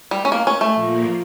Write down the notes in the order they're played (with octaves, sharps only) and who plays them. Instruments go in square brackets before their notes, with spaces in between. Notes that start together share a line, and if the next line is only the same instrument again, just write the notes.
[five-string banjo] G3
C#4
A#3
C#4
A3
[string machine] A#2 F3 A#3